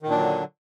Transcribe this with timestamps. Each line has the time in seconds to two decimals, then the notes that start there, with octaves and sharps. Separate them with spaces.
0.03 D#3
0.07 A#2
0.11 D4
0.15 F#3
0.18 D3